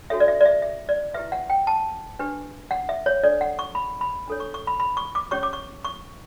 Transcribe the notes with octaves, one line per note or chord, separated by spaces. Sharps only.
D4 F#4 A4 C#5 E5
D5
E5
D5
E5
E5
D5
E4 G4 B4 E5
F#5
G5
A5
D4 G4 B4
F#5
E5
C#5
D4 A4 C#5 D5
F#5
C#6
B5
B5
D4 A4 C#5
C#6
C#6
B5
B5
C#6
D6
C#4 G4 C#5 C#6
D6
C#6
C#6